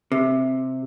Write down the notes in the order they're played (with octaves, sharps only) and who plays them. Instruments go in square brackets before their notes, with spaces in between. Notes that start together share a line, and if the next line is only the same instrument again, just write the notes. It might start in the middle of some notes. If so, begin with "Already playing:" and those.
[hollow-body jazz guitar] C3